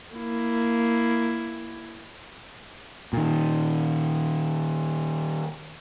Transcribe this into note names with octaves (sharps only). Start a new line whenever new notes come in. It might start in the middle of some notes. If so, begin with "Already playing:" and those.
A#3 E4
A#2 D#3